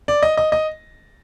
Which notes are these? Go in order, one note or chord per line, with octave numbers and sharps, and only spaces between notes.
D5
D#5
D#5
D#5